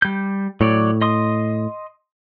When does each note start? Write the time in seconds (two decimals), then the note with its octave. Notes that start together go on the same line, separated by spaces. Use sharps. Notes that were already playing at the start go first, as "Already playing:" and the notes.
0.02 G3 G6
0.61 A2 F#3 C#5 D5
1.01 D#5 C6 D#6